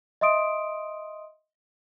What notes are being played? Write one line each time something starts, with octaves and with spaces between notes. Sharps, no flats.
D#5 E5 C6 D#6 D7